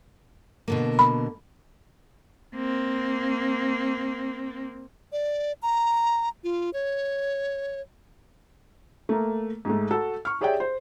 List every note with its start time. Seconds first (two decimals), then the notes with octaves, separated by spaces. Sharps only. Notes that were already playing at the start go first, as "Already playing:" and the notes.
0.68 B2 D3 A#3
0.99 B5
2.55 A#3 C4
5.12 D5
5.62 A#5
6.44 F4
6.73 C#5
9.09 A3 A#3
9.65 G#2 G#3 A3
9.91 F#4 A4
10.25 C#6 F6
10.41 G4 G#4 C#5 D5 E5 G5
10.60 C5